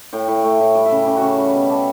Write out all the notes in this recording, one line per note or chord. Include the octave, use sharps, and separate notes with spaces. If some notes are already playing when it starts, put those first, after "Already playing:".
A2 G5
A2
A3
A2
G3 G5
E5
C#3
C#3 G4
F#4
C#3
G3
B2
G3 A4